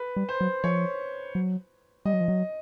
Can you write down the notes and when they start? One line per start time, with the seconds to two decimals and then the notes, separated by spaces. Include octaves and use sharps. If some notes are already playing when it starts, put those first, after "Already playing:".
Already playing: B4
0.16 G3
0.29 C5
0.41 F#3
0.64 F3 C#5
1.35 F#3
2.05 G3 D#5
2.13 F#3
2.20 F3
2.28 F#3